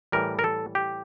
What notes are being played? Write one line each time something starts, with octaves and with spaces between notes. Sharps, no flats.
A2 E3 G3 A#4
A#4
A4
G4